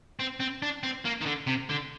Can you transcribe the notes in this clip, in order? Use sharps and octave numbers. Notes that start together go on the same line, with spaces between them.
C4
C4
D4
C4
A#3
D#3
D3
C3
D3